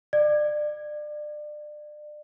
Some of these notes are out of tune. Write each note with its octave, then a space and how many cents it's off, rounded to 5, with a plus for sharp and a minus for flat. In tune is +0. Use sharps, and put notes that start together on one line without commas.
D5 +30